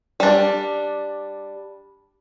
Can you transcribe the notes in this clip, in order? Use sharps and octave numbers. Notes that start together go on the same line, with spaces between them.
G3 D4